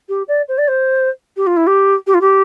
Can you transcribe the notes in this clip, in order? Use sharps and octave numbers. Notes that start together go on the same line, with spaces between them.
G4
D5
C5
D5
C5
G4
F4
E4
G4
G4
F4
G4